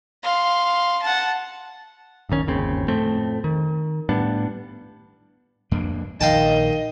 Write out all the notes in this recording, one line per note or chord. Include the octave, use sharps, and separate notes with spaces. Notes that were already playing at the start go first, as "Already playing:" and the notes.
F5 C6
F#5 A5
D1 G#1 D#3 C#4
G1 D#2 C#3 C4
F2 A2 A3 C4
D#3
A2 G3 B3 D4
F2 A#3 D4
A#1 D#3 D#5 F5 G5 A5